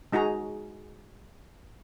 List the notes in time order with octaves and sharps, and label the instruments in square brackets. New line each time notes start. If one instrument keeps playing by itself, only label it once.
[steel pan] G#3 D#4 F#4 G#4 A#5